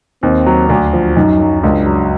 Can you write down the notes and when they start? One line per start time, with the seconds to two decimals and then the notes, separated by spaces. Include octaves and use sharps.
0.23 D#2 C4
0.46 F#3
0.69 D2 D4
0.93 F3
1.16 F#2 D#4
1.40 F#3
1.63 C#2 D4
1.86 F#3